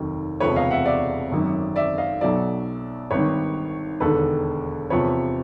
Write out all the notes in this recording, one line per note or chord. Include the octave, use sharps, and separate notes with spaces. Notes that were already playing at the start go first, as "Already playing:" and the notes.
Already playing: F1 D#2 D#3 F#3
E1 D2 C3 F3 B4 C#5
D#5 F5
E5 F#5
D5 E5
G#1 F#2 D#3 F#3
D5 E5
D#5 F5
B1 B2 F#3 D5 E5
G#1 G2 D#3 B4 C#5
E1 D#2 D3 A4 B4
E2 C3 F3 B4 C#5